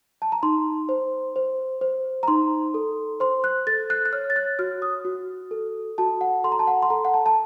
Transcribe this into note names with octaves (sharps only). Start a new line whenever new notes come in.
A5
A#5
D#4 C6
C5
C5
C5
A#5
D#4 C6
A4
C5 C6
F#6
A4 A6
F#6
F#6
C#5 F6
A6
F#6
F#4 F6
D#6
F#4
A4
F#4 A5
F#5
A4 C6
A#5
A5
F#5
C6
A4 A#5
F#5
A5
A5